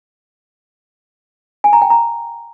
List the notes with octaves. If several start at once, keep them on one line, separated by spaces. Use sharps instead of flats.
G#5
A#5
G5
A#5